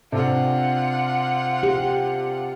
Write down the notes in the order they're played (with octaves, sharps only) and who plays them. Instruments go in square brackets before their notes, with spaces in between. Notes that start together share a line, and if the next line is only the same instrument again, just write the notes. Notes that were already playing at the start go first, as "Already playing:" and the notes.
[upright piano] C3 D4 A4 [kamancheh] F4 F#5
[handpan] G4